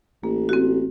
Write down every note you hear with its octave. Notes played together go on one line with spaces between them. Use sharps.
A1 A#3
C4 F#4